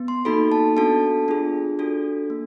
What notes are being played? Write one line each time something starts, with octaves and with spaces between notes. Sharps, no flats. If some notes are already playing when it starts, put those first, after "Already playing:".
Already playing: B3
C6
A#3 D#4 F#4 A4 B5
A5
B3 D4 F#4 A4 A5
D4 F4 G#4
D4 F#4 A4
A#3